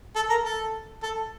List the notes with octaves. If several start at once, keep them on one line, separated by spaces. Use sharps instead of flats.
A4
A#4
A4
A4